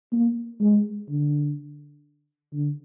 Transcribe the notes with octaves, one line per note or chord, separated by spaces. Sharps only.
A#3
G#3
D3
D3